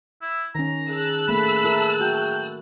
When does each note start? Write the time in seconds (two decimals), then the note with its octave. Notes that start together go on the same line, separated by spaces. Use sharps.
0.22 E4
0.55 D#3 C#4 A#5
0.90 G#4 A5 E6 F#6
1.29 A3 A#3 B5
1.64 E4 A#4
2.00 F#4 G5